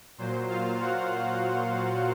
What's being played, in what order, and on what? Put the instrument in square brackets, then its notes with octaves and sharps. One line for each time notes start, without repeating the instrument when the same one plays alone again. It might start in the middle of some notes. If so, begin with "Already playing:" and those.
[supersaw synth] A#2 F#3 C5
F4 F5
F#4 F#5